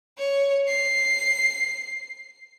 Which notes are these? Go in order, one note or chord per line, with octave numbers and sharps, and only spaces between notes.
C#5
C7